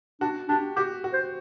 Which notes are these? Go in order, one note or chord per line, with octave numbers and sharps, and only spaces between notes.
D4 F#4
D4 G4
F#4 G4
F#4
C5